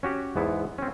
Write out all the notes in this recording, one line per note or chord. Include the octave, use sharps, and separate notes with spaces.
C#4 F#4 G4
E2 G#2 B3 E4
C4 C#4